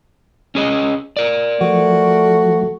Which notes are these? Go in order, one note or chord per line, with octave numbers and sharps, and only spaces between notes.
C#4 G#4 D#5
A#4 D5
F3 A3 F#4